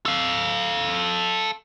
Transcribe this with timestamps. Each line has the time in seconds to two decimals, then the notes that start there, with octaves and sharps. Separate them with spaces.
0.06 A4 F5